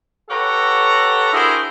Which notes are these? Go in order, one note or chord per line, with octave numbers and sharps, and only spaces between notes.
G4 A4 B4 C#5 F#5 A#5
D4 E4 F#4 G#4 A#4 C5